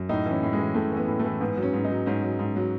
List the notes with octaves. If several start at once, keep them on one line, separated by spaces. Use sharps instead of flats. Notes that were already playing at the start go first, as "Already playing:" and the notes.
Already playing: F#2
A2 D#4
E3 C#4
A2
G#3
E3
A2 A3
E3 B3
A2
A3
E3
G#2 B3
F#3
C#4
G#2
D#4
F#3
G#2 C#4
F#3
G#2
F#3